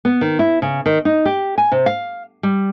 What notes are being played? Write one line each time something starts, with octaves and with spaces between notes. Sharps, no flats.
B3
D#3
E4
C#3
D#3
D#4
G4
G#5
C3
F5
G3